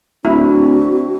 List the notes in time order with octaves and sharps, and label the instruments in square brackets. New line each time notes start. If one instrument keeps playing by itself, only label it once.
[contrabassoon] D1 [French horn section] C4 D4 [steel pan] E4 [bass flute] F#4